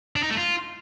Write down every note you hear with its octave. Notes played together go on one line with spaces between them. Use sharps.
D4
D#4
A3
F4